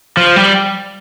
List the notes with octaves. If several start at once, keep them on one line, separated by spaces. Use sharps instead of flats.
F3
G3